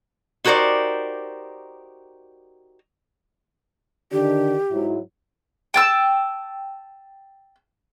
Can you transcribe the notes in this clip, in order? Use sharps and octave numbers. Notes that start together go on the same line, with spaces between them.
D#4 F#4 G4 A#4 C5 D5
D3 D#3 D4 G4
G#2 F#3 E4
G5 A5 E6